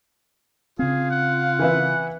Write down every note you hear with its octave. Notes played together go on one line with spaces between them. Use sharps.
C#3 C4 F4 G#4
F#5
E3 B4 E5